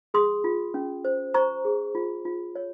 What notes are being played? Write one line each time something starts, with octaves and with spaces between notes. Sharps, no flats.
G#4 C6 D#6
F4
C#4
C5
C5 A#5 C#6
G#4
F4
F4
C#5